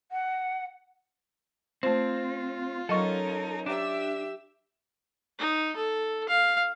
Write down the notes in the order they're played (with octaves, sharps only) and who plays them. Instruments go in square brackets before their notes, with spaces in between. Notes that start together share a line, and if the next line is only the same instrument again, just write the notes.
[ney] F#5
[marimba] A3 C5 [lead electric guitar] C4 [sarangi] F4
[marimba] F#3 D#5 C#6 [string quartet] C#4 D#4 A#4 [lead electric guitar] A4
[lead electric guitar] D4 [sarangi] G4 [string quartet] E5 E6
[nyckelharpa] D#4
A4
F5